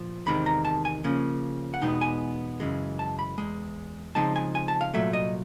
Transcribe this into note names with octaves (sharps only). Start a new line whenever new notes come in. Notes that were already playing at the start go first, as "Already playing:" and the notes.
Already playing: A#2 F3
E2 C3 D#3 G#3 C4 B5
A#5
A5
G#5
C#3 F3 A#3 C#4
F#5
E2 B2 G#3 B3 D#4 G5
G#5
F#2 C#3 E3 G#3
A5
B5
E2 B2 G#3
C#3 F3 G#3 C4 D#4 A5
G#5
G#5
A5
F5
C2 A#2 F#3 A3 E5
D#5